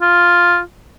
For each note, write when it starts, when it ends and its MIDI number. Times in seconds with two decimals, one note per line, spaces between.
0.02 0.60 65